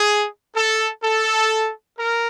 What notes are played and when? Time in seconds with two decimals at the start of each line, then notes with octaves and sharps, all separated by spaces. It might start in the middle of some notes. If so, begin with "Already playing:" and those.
Already playing: G#4
0.55 A4
1.03 A4
1.99 A#4